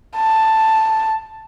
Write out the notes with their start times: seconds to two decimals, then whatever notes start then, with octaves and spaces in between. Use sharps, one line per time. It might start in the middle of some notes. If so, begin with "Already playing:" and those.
0.17 A5